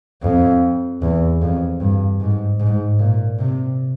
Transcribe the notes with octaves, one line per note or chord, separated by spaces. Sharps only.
F2
E2
F2
G2
G#2
G#2
A#2
C3